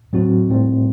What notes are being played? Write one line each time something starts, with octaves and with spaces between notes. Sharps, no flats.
A2 F#3 C4 F#4
A2 G3 C4